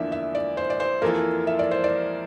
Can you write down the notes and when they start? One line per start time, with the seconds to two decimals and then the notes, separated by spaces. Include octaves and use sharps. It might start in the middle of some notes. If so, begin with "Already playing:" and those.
Already playing: E2 D3 F3 A#3 D4 E5
0.12 E5
0.35 D5
0.57 C5
0.70 D5
0.80 C5
1.02 F2 E3 A#3 F4 A4 A#4
1.47 E5
1.59 D5
1.71 C5
1.84 D5